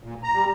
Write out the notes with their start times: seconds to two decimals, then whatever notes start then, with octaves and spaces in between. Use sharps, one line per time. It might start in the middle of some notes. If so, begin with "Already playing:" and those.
0.03 A#2
0.23 A#5
0.34 G3